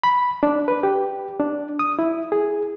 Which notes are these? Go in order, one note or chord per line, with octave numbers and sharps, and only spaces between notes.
B5
D4
B4
G4
D4
D#6
E4
G#4